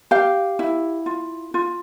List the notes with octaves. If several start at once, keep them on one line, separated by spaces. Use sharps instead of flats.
G4 F5
E4
F4
F4